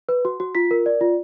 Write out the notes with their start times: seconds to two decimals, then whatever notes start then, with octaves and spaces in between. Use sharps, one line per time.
0.09 B4
0.25 F#4
0.40 F#4
0.55 F4 B6
0.71 A#4
0.86 D5
1.01 F4